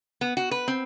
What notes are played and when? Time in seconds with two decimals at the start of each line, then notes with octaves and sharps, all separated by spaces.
0.21 B3
0.37 F#4
0.51 B4
0.68 C4